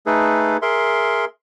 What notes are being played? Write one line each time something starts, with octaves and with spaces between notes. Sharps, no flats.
A3 D#4 G#4 A4 B4
G#4 A#4 E5 C6